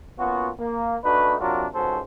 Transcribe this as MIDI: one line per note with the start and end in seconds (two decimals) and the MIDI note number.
0.19 0.50 58
0.19 0.50 59
0.19 0.50 61
0.19 0.50 65
0.19 0.50 66
0.60 0.96 58
1.04 1.37 57
1.04 1.37 62
1.04 1.37 63
1.04 1.37 66
1.04 1.37 71
1.41 1.67 48
1.41 1.67 54
1.41 1.67 62
1.41 1.67 65
1.41 1.67 66
1.41 1.67 70
1.75 2.00 37
1.75 2.00 44
1.75 2.00 61
1.75 2.00 66
1.75 2.00 69
1.75 2.00 72